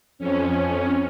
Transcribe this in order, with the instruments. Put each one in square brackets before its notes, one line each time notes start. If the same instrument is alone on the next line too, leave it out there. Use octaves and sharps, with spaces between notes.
[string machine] F2 C#4